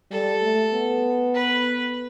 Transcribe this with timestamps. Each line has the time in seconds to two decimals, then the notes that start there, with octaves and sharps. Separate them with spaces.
0.11 G3 A4
0.42 A3
0.73 B3
1.35 B4